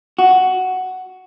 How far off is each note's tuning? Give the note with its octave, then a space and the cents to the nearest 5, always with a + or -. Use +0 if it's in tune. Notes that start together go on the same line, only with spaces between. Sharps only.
F#4 +5